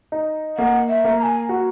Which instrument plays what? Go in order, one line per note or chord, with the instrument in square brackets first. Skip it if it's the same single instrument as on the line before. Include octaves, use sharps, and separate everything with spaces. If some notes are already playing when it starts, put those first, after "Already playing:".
[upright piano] D#4
[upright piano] A#3 [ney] F#5
[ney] E5
[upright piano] A#3
[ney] A#5
G#5
[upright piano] F#4